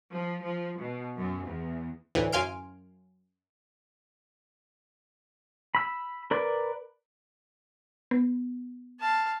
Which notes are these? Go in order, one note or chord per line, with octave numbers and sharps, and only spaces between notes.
F3
F3
B2
F#2
E2
D2 A2 E3
F#2 F5 G#5 C6 F6 D7
B5 E6
A#4 B4 D5 B5
B3
F5 A5